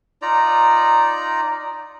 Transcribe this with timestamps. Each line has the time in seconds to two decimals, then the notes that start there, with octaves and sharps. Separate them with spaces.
0.22 D#4 F4 D5 A#5